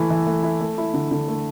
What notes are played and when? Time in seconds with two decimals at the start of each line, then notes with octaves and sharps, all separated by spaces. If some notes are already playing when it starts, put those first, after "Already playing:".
Already playing: E3 A3 E4
0.10 E3
0.27 A3
0.43 E4
0.61 A3
0.78 E4
0.94 D3
1.11 D3
1.28 A3